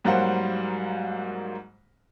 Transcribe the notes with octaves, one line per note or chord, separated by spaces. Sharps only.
G#2 F#3 G3 A#3 C5 F#5